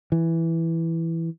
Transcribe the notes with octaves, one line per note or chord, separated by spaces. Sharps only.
E3